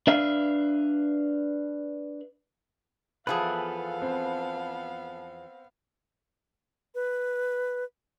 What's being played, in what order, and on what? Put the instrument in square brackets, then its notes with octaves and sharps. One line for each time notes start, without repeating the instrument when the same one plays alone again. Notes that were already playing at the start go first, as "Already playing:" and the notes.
[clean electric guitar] D4 B4 E5 F5
[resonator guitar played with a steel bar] E2 F3 G#4 [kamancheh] B3 F5 [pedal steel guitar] A4 B4
[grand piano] C4
[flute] B4